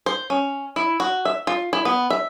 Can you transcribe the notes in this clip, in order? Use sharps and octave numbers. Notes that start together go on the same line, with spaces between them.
C5
C#4
E4
F#4
E5
F4
E4
B3
E5